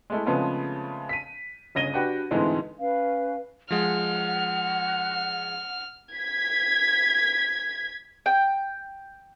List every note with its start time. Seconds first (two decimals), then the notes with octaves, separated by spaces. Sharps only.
0.10 G#3 A3 E4
0.26 C#3 F3 G#3 A3 B3 C4
1.09 B6 D#7
1.75 G1 C#3 D#5 A#6 D#7 G7
1.94 D4 F#4 G4 B4 G5
2.31 D2 G#2 E3 G#3 A3 C4
2.79 C#4 B4 F5
3.71 F3 G#3 F#5 F6
6.12 G#6 B6
8.26 G5